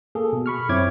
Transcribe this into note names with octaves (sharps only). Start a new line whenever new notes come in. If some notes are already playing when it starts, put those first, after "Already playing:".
A#3 G#4 A4
B2
B5 C#6 F6
F#2 C4 E4 C#5 D6 G#6